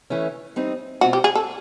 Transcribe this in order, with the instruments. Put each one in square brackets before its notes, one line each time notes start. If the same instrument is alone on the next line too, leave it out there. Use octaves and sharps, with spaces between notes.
[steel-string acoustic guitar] E3 A3 C#4
G3 C4 D#4
[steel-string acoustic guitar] B2 G#3 C4 F4 [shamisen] F#4
[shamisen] G4
G#4
A4